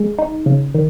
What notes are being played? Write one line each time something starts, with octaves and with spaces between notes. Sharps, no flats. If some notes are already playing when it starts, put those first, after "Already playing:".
Already playing: G#3
D#4
C#3
D#3